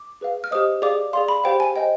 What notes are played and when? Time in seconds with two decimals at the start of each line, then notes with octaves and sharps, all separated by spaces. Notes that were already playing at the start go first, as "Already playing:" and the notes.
Already playing: D6
0.21 G#4 B4 F5
0.44 F6
0.51 G4 C5 D#5 D#6
0.82 G#4 D5 F5 D6
1.13 G#4 D5 F5 C6
1.28 B5
1.44 G4 C5 F5 G5
1.60 G#5
1.76 C5 D#5 G5